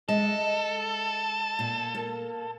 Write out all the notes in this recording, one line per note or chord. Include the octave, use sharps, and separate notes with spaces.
G#3 A4 D#5 E5
A#2
A#3